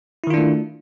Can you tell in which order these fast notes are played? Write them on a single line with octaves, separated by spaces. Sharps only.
E4 D#3 F4 D4 A3